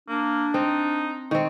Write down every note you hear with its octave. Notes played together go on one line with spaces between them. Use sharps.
A#3 D4
C4 D#4
D#3 C4 C#6